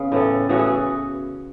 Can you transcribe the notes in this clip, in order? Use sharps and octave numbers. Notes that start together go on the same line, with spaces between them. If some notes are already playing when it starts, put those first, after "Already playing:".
Already playing: C#3 B3 C#4
A2 E3 A3
A2 E3 A3 F#4
G#4